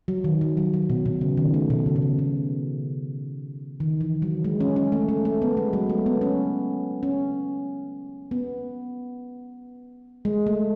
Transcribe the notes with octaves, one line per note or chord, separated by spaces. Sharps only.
F#3
D#3
F#3
F#3
F#3
B2
B2
C#3
D#3
A3
B2
C#3
B2
C#3
B2
D#3
E3
F#3
G#3
C#4
C#4
A3
A3
A3
B3
G#3
F#3
A3
B3
C#4
C#4
B3
G#3
A3